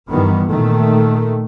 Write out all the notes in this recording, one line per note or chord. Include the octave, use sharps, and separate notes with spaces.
G2 D#3 E3 G3 B3
A#2 D#3 A3